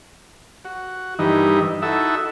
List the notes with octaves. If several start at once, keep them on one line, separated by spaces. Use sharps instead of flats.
F#4
G2 D#3 E3 D#4
D#4 E4 F#4 A4 E5